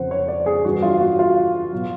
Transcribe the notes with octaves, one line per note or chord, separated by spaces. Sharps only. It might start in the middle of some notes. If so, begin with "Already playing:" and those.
Already playing: F2 C#3 F3 C5 F#5
C#5
D5
G#4
G2 E3 F#4
F4
F#4
F4
B2 F#3